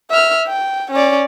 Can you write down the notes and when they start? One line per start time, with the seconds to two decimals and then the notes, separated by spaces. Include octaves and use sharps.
0.10 E5 F6
0.47 G5
0.91 C#4 D5